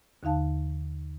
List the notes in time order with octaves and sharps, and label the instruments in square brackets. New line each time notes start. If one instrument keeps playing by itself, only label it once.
[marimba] D#2 D3 D#4 F5 A5